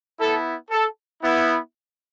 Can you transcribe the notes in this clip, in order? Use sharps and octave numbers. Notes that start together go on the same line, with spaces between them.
B3 E4 A4
A4
B3 E4